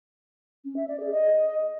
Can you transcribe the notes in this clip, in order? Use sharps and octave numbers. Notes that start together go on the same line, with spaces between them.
C#4
E5
D5
G#4
D#5